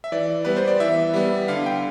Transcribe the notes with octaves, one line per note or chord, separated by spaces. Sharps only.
E5
E3 D5
G3 B3 B4
C5
D5
E3 E5
G3 B3
D3 F5
G5